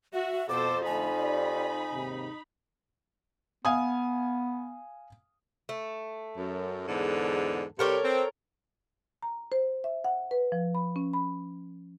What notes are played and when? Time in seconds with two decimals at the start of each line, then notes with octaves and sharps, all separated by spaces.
0.13 F#4 E5
0.49 F2 B2 A4 C5 D6
0.86 D3 A3 D#4 G#5 A5 B5
1.19 G4 D5
1.93 D#2 G#2 C3
3.65 B3 F5 G#5 D#6
5.69 A3
6.37 F#2
6.87 E2 G#2 D3
7.79 C3 G3 G4 A4 A#4 C#5
8.04 C4
9.23 A#5
9.52 C5
9.84 E5
10.04 F#5
10.31 B4
10.52 F3
10.75 B5
10.96 C#4
11.13 B5